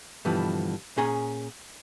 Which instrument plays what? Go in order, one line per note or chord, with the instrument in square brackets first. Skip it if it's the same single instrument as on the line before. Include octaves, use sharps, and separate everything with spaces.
[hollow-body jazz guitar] G2 B2 D3 E3 F3
A#2 C#4 G#4 G#5 A#5